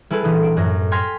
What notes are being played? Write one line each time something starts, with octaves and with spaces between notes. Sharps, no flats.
G3 E4 G#4 A4 B4
A#1 E3 G3 D#6
D7
F#2 A2 A#6
G5 G#5 C6 F6 A#6 B6